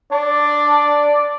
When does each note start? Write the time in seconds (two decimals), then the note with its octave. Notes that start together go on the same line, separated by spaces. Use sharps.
0.12 D4 D5